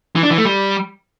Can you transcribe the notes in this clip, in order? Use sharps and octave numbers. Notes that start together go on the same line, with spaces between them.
E3
D4
E3
A3
G3